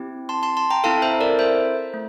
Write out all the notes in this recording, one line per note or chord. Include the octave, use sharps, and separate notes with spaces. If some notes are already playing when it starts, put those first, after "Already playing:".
Already playing: C4 E4 G4
A5 C6
A5 C6
A5 C6
G5 A#5
C4 E4 A4 F5 A5
C5 E5
A#4 D5
C5 E5
A3